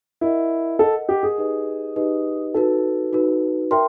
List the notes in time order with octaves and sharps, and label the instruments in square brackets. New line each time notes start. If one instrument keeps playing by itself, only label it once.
[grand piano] E4 [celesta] A#4 D#5 F#5
[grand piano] A4 [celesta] A#4 D#5 F#5
[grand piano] G4
G#4
[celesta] D#4 G4 B4 D#5
D#4 G4 B4 D#5
[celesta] D#4 F#4 B4 [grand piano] A4
[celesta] D#4 F#4 B4
[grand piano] A#4 [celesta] E5 G5 C6